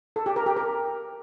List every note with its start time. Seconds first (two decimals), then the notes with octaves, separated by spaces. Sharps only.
0.16 A4
0.26 G4
0.36 A#4
0.46 G4
0.56 A#4